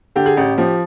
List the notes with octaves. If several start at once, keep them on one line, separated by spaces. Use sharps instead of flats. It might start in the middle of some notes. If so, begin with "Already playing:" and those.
D3 G4
G#4
A1 G4
F3 G4